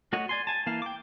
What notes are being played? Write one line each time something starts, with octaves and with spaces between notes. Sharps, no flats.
A3 F#4 C#5 D#5
D5 G#5 C6
G#5 A5
E3 A#3 F5 A5
G5 D6